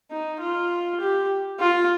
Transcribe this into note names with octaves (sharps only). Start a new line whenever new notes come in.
D#4
F4
G4
F4